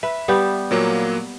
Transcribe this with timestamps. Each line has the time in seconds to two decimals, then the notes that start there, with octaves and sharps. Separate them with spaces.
0.03 B4 E5
0.28 G3 B3 G4
0.71 A#2 F#3 A#3